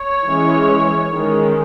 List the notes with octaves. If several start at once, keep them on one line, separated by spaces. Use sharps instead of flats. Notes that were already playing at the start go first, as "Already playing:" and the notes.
Already playing: C#5
E3 G#3 C#4
D#3 G#3 C#4